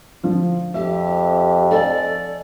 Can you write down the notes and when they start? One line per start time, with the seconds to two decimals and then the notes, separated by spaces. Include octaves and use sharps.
0.23 D3 F3 F4
0.74 F2 G4 E5
1.71 A4 D5 D#5 G#5